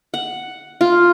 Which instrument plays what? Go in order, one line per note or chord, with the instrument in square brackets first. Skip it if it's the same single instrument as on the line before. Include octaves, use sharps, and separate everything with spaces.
[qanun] F#5
F4